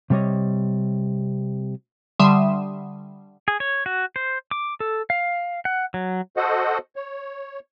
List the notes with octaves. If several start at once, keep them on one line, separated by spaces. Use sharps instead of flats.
C3 G3 C#5 D#5
D3 G3 E5 C6 D#6 E7
G#4
C#5
F#4
C5
D6
A4
F5
F#5
F#3
F#4 A4 C5 D#5 F#5
C#5